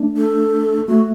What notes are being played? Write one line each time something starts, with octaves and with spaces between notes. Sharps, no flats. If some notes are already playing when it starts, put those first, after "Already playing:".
Already playing: A3 D4
A4
A3 F#4